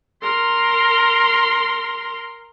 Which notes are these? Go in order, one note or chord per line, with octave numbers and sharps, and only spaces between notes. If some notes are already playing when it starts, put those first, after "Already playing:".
A#4 C6